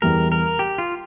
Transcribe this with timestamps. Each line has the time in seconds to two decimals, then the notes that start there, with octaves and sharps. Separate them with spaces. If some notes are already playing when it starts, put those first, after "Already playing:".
0.02 E2 E3 G3 A#4
0.32 A#4
0.59 G4
0.78 F4